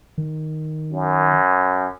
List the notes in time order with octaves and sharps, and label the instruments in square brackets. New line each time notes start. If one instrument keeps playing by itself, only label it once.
[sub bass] D#3
[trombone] F#2